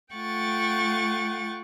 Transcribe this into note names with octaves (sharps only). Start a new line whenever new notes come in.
A3 F4 F#5 G5 C#6 A6